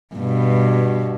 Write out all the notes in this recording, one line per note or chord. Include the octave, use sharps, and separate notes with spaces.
G2 B2